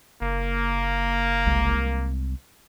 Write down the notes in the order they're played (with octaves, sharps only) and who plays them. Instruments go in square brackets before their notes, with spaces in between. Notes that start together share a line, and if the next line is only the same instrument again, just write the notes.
[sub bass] F#1 [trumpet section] A#3
[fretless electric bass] C2 C3 G#3